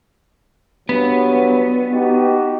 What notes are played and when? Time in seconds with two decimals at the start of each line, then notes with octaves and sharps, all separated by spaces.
0.89 G2 F#3 G3 B3
1.92 D#4 F#4 G4